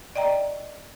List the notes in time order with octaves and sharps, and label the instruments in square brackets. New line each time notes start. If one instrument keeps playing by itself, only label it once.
[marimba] D5 D#5 G5 A#5